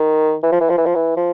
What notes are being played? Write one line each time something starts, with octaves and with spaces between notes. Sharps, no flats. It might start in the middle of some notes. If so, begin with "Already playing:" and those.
Already playing: D#3
E3
F3
E3
F3
E3
F3
E3
F3